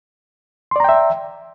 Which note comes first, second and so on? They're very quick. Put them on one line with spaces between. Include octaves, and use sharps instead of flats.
C6 D5 A#5 G5 E5